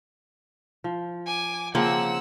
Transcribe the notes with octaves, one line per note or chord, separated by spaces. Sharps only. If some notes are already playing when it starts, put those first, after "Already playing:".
F3
G#5 D6
C#3 F3 A#3 C4 F#5 E6